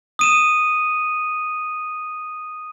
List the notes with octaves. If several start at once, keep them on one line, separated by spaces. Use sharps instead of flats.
D#6 D#7 E7